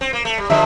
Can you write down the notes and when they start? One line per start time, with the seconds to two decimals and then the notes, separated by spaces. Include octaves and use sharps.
0.01 C4
0.13 A#3
0.25 A3
0.38 G3
0.50 D3 F3 E5